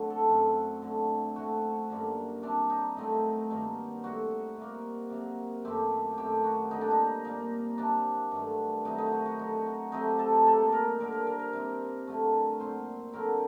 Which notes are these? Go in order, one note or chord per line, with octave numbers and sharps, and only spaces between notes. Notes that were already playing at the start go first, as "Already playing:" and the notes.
Already playing: D3 F#3 A3 C4 F#4
A4
F#2 F#3 A3 C4
D3 F#3 A3
A2 A3 C4 F#4
F#2 D3 G3 A#3
C3 G3 C4 D4
D#4
A2 F#3 A3 C4 D#4
G2 D#3 F#3 A#3
A2 G3 C4 F#4
C3 G3 A#3
C3 F#3 A#3
F#2 D#3 A3 C4 G4
F#2 D#3 A3 C4 G4
F#4
D3 G3 A#3 D#4
D4
D#4
A#2 G3 A#3 D#4
C3 F#3 C4 D4
G2 D#3 F#3 A3
C3 D#3 F#3 A3 D#4
D#4
F#4
F#4
D3 F#3 C4 D#4
F#4
C3 F#3 A3 C4 D#4
G4
A4
A4
A2 G3 A#3 A4
A#4
D3 G3 C4 A#4
A#4
A#4
A#4
C3 G3 C4
D3 F#3 A3
A#2 F#3 C4 C5
D3 F#3 C4 A#4